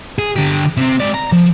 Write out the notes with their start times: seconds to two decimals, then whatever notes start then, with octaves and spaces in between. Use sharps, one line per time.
0.19 G#4
0.36 D3 G4
0.77 C3 C4
1.00 G#2 D5
1.14 A#5
1.32 F3